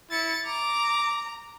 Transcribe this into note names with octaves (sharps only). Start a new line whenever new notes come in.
E4 A6 C#7
A#5 D6